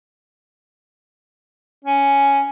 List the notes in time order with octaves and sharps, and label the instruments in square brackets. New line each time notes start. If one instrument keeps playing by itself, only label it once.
[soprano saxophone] C#4